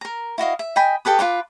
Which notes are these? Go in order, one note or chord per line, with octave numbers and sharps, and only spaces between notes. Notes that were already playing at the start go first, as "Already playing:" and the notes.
A#4 A#5
E4 F#4 D#5 F5
E5
D#5 G5 G#5 B5
G4 A4 B4 D#6
F4 B4 C#5 D6